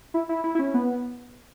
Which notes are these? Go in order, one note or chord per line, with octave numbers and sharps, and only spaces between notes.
E4
E4
E4
E4
C#4
B3